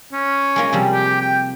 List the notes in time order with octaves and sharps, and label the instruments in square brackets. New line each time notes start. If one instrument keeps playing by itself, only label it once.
[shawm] C#4
[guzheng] G#3 A#3 F4
C3 F3 G3
[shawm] G4
G5